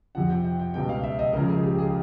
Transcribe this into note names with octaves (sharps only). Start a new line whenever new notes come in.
F2 C3 F3 F#5
G5
G5
G5
C#2 B2 G3 G5
F5
E5
D#5
C#2 C#3 F3 A#4
G#4
G4
G#4